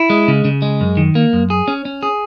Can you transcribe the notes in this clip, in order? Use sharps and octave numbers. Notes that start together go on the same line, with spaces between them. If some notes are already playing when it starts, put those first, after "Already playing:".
Already playing: E4
G#3
C#3
C#3
G#3
F#2
D#3
A#3
F#2
G#4
C#4
C#4
G#4